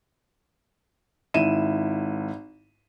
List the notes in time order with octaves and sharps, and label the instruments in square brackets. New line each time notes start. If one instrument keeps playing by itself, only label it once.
[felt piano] G#1 E4 D#7 E7